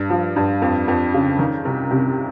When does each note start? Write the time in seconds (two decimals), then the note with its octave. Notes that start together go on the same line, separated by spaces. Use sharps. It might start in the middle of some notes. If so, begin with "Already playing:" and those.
Already playing: G2
0.10 F3
0.36 G2
0.62 F2
0.88 F2
1.14 C#3
1.39 D#3
1.65 C2
1.91 C3